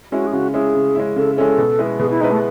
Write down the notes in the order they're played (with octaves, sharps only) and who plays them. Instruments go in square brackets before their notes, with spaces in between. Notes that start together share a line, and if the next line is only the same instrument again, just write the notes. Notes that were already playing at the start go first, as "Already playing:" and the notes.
[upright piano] G#3 C#4 E4 [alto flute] F#4
[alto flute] G#4
[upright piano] C#3 [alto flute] F#4
[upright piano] G#3 C#4 E4 [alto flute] G#4
[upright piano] C#3
G#3 C#4 E4
[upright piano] C#3 [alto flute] A4
[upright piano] G#3 C#4 E4 [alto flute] A4
[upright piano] B2
G#3 B3 E4 B4
[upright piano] B2 [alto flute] G#4
[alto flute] E4
[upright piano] G#3 B3 E4 B4 [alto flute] D#4
[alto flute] A3